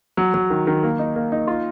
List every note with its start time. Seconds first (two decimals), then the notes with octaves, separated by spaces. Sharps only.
0.17 F#3
0.34 F#3
0.50 D#3
0.67 D#3
0.83 A#3
0.99 D#4
1.16 A#3
1.32 D#4
1.48 F4